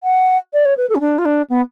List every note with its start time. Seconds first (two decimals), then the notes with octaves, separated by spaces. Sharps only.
0.04 F#5
0.53 D5
0.65 C#5
0.77 B4
0.89 A4
0.95 C#4
1.00 D4
1.18 F4
1.25 D4
1.50 B3